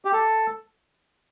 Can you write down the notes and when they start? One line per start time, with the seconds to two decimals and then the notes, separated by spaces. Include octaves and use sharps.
0.05 G4
0.13 A4